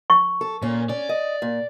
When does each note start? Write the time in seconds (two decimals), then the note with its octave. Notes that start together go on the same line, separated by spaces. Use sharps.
0.10 C#6
0.41 A4
0.62 A#2 C#4
0.89 C#4 D5
1.09 D#5
1.42 A#2